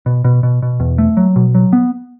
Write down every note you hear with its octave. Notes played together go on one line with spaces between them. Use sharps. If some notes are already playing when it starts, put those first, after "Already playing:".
B2
B2
B2
B2
E2
A3
F#3
B2
F#3
B3